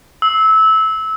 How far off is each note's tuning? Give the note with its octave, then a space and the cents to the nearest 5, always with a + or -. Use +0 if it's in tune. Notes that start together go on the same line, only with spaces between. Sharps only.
E6 -20